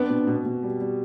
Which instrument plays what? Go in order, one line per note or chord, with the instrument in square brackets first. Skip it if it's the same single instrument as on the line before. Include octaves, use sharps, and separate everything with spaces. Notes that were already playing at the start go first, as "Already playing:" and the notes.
Already playing: [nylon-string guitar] B3 D4 [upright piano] C4
[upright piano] B2
B2
B2
G3
G3